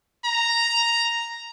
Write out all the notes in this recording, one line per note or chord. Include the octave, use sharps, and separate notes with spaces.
A#5